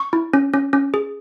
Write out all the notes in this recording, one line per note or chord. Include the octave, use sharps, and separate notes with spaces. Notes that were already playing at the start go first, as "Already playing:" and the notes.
Already playing: C#6
E4
C#4
C#4
C#4
G#4